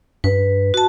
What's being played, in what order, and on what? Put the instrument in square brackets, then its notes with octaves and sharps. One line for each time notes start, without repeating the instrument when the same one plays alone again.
[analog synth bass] G2 [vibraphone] B4
[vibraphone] F#4 A5